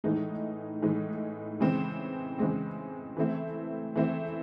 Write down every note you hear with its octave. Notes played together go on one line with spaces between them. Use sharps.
A2 E3 G#3 D#4
A2 E3 G#3 D#4
C#3 E3 G#3 C4
C#3 E3 G#3 C4
E3 A3 C4 E4
E3 A3 C4 E4